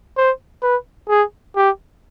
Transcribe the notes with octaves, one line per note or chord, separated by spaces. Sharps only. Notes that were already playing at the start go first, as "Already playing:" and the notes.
C5
B4
G#4
G4